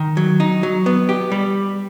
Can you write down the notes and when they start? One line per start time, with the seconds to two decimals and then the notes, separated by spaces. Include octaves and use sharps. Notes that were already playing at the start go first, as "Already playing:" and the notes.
Already playing: D#3
0.17 F#3
0.40 D#4
0.63 F#3
0.86 B3
1.09 G4
1.32 G3